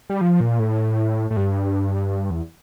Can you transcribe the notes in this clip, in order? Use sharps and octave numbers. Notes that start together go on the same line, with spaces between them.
G3
F3
A#2
A2
A2
G2
E2